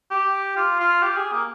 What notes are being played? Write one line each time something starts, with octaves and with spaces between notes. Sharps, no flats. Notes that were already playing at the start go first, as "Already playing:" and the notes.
G4
F4
F4
G4
G#4
A#3